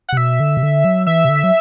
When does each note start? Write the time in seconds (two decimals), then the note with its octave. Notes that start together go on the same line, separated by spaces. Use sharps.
0.09 F#5
0.12 C3
0.17 B2 E5
0.40 D3
0.57 C3
0.62 D3
0.85 F#3
1.07 E3 E5
1.25 C3
1.29 D3
1.44 F#3